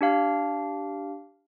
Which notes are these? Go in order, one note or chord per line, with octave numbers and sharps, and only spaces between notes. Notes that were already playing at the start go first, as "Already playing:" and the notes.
D4 G4 F5 F6